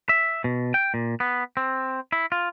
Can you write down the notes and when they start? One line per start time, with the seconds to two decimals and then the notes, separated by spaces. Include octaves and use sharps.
0.09 E5
0.44 B2
0.74 G5
0.94 A#2
1.20 B3
1.57 C4
2.12 E4
2.32 F4